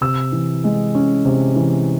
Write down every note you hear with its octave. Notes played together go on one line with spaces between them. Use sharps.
C3 E6
E3
G#3
C#4
C3
E3